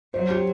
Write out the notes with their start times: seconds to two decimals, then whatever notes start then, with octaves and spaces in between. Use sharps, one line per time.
0.14 F#3 C5
0.30 G4